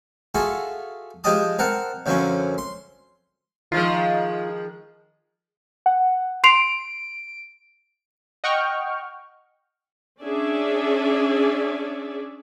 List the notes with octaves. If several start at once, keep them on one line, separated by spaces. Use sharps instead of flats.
F4 F#4 G#4 A4 E5
F3 G#3 G4 D#5 A5 D#6
C4 A#4 F#5 A5
F#2 D3 F3 F#3 C4 C#4
C6
D#3 F3 G#3 F4
F#5
C6 C7 D7 F7
D#5 F#5 G5 C#6 F6
C#4 D4 G#4 D5 E5